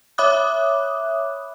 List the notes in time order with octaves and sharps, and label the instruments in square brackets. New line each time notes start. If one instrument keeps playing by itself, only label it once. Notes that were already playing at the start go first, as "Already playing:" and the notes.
[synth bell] C#5 E5 B5 D6 D#6 F#6